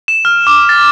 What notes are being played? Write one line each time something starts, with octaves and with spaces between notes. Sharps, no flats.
E7
F6
D6
A6